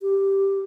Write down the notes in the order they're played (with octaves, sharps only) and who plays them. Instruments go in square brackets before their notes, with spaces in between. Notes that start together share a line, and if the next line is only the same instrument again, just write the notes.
[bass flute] G4